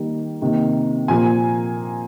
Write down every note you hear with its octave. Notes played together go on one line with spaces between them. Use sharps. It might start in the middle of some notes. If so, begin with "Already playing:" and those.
Already playing: D#3 G3 A#3
C3 D#3 A#3
A#2 F3 A#3 G#5